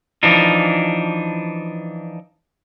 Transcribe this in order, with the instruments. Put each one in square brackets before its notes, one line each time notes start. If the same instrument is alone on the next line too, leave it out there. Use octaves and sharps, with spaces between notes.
[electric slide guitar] E3 F3 D4 D#4